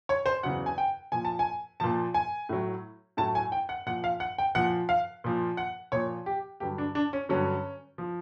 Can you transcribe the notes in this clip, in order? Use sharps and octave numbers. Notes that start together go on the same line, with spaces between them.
C#5
C5
E2 C#3 F#3 F#5
G#5
G5
A#2 F3 G#5
A5
G#5
A#2 F3 A5
G#5
A2 F#3
A2 F#3 A5
G#5
G5
F#5
A#2 F3 F#5
F5
F#5
G5
A#2 F3 F#5
F5
A#2 F3
F#5
A#2 F3 C#5
G4
G2 D3 F#3 G4
D4
D4
C#4
G2 D3 F#3 C#4
F3